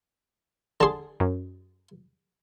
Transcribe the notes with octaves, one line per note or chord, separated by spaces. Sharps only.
D3 G#4 A5 C6
F#2